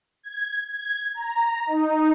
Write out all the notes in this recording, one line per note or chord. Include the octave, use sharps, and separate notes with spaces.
G#6
G#6
A#5
D#4